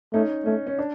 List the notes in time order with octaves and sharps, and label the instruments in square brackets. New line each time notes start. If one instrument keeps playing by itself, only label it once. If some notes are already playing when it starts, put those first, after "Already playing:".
[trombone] A3 [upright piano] C#4 D#4
[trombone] A3 [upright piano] C#4
[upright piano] C#4
D4